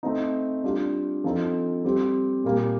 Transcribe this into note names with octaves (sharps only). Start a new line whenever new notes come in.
A3 C4 D#4
G3 D4 F4
F3 C4 D#4 A4
G3 C4 G4
A#2 G3 A#3